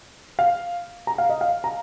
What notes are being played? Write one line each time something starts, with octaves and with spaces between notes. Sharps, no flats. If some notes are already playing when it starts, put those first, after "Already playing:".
F5
A#5
F5
D#5
F5
A#5